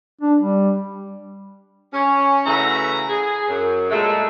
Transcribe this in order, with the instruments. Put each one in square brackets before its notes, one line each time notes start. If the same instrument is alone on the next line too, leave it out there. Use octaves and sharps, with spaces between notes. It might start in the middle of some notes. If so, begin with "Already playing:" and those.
[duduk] D4
G3
[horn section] C#4
C#3 E3 A3 E4 F#4 A#5
G#4
F#2
A#2 G#3 A3